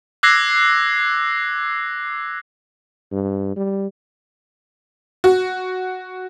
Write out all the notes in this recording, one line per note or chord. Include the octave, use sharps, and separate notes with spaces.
D6 E6 F#6 G#6 A#6 C7
G2
G3
F#4